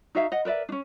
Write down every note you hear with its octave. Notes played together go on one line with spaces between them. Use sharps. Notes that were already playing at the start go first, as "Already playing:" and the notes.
D#4 F#4 E5 F5
D#5 F#5
A#4 B4 D5 E5
C#4 D4